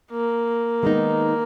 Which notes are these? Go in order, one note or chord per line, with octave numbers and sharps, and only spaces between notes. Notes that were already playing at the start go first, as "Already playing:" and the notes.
A#3
D#3 G#3 B3 D#4